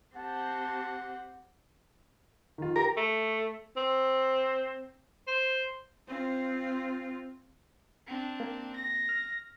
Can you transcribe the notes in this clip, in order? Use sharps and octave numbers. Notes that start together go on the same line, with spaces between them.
C4 G4 F#5 A5
D#3 F4
G4 A#4
A3
C4
C5
C4 F4
C4 D4
A#3
A#6
F6